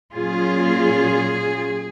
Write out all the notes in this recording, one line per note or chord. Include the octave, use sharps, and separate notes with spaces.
A#2 F#3 C#4 F4 G#4